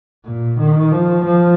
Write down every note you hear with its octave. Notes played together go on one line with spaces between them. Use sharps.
A#2
D#3
F3
F3